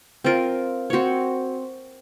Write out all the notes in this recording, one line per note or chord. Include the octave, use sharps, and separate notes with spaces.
C4 F4 A#4
C4 F#4 C#5